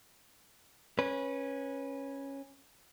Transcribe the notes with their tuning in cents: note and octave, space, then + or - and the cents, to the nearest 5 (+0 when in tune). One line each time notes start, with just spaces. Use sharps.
C#4 -10 B4 -15